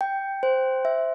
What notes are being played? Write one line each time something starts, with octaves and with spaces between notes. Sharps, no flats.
G5
C5
E5